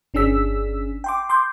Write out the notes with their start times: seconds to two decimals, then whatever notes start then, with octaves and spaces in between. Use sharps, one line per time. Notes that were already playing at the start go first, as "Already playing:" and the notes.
0.14 G1 C#4 D4 G#4 E6 B6
1.04 G5 C6 D6
1.29 C6 D6 G6